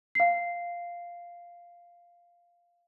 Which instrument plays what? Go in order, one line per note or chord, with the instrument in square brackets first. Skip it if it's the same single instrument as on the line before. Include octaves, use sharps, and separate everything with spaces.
[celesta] F5 C7